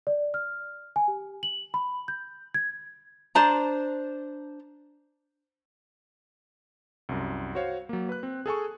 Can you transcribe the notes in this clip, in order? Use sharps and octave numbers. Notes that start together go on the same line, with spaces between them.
D5
F6
G#5
G4
F#7
B5
G6
G#6
D4 C5 A5 A#5
C2 F#2
F#4 C5 C#5 F5
F#3 A#3
B4 F#6
C4
G#4 A4 G#5 C#6